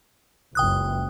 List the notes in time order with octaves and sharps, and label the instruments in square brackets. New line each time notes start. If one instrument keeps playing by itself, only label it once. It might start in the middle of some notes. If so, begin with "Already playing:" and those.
[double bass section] F#1 C#2 [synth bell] G5 D#6 F#6